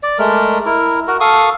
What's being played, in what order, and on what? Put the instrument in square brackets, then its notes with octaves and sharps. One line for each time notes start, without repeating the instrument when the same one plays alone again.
[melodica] D5
G#3 A3 A#4
E4 A#4
F#4 A#4
A4 F5 C#6 D#6